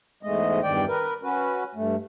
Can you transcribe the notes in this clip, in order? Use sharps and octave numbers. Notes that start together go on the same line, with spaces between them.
E2 G#2 G#3 A3 D#5
E2 G2 D#3 D5 G5
A#4 B4
C#4 F#4 B4
G2 A3